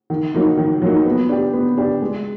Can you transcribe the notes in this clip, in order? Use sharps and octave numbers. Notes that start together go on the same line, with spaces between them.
D#3
F#3 A#3 D#4
D#3
F#3 A#3 D#4
B3
D4 G4
B3
D4 G4
G#3